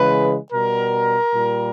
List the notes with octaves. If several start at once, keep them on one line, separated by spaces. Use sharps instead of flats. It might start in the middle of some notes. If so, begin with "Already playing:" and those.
Already playing: C#3 E3 G#3 B4
B2 G3 A#4
A#2 G3